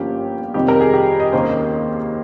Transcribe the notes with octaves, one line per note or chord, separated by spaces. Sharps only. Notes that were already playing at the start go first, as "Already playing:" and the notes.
Already playing: G1 G2 F3 A#3 C#4 G4
F2 C3 D#3 G3 G4
A#4
G#4
G4
D#5
D#2 D#3 A#3 C#4 C5